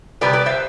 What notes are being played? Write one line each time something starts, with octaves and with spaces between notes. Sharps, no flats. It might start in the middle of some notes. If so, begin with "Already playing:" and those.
C3 G3 B3 B4 D5
B4 D5
C5 E5